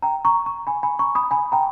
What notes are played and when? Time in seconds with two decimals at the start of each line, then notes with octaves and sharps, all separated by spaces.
0.02 G5 A#5
0.25 A#5 C#6
0.46 A#5 C#6
0.67 G#5 B5
0.83 G#5 B5
0.99 A#5 C#6
1.15 B5 D#6
1.31 G#5 B5
1.52 G5 A#5